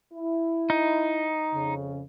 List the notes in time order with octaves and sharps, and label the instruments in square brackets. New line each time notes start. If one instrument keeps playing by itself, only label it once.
[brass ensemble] E4
[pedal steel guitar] D#4
[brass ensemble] F2 C#3